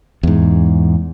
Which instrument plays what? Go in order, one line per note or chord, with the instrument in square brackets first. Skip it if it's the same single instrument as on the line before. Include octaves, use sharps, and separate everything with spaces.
[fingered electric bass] E2 G#2